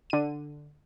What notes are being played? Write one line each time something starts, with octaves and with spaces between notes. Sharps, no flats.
D3 D#7